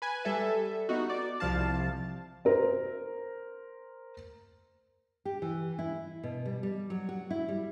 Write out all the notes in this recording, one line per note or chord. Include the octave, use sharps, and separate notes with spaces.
B4 G#5
G3 A4 E5
B3 D#4 F#4
D5
C2 F3 F5 A5
A#4 C5
G4
E3
E4
B2
G3
G3
F#3
F#4
E4
G3